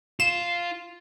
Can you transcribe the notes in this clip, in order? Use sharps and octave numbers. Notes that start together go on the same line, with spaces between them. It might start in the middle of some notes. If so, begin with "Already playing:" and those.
F4 E7